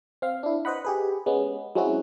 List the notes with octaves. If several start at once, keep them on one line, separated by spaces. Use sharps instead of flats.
C4 F5
D4 E4
B4 C5 D#5 F#5 B5
G4 G#4 B4
G#3 B3 C#4
F#3 G#3 C4 C#4 E4 F#4